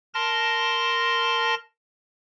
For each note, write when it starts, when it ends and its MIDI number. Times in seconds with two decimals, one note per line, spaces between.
0.14 1.55 70
0.14 1.55 81
0.14 1.55 84
0.14 1.55 94